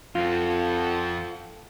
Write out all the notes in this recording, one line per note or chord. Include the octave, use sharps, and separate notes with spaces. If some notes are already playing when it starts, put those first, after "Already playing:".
F2 C4 F4 A4 F#5